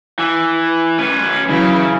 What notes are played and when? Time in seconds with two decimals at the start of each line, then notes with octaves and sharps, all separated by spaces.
0.19 E3
0.99 C#4 B4
1.49 C#3 E3 F#3 E4